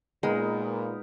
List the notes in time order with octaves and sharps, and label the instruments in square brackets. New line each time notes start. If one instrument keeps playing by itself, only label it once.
[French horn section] A#2 [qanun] G#3 [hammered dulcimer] B3 D#4 A#4